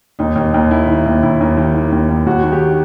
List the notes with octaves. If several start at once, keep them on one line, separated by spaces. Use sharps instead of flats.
D#2 D#4
D#2
D#2
D#3 E4
D#3
D#2
D#2 E4
D#2
D#3
D#3
D#2
D#2
D#2 F#4
D#3
G4